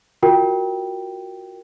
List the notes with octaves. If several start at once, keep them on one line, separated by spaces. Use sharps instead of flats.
F4 F#4 A#4 G5